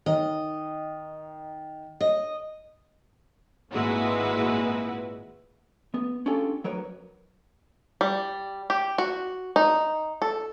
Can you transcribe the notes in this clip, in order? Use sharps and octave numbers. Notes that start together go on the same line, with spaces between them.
D#3 D#5
D#5
G#1 A#2 G#3 E4 F#4 B4
B3
C#4 D4 F4 G4 A4
F#3 A#4 B4 C#5
G3
G4
F#4
D#4
A4